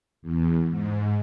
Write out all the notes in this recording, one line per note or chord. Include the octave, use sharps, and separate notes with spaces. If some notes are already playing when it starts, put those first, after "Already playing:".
E2
G#2